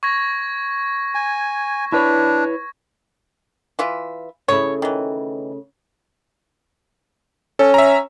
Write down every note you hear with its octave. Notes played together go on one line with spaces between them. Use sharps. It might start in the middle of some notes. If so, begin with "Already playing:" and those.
C#6 G#6 A#6
G#5
D4 E4 B4 C#5
E3 F4 E5
C#3 A3 E4 C#5
D#3 E3
C#4 A4
E5 A#5